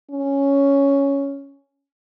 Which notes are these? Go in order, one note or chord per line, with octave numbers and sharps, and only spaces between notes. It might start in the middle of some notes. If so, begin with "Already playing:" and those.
C#4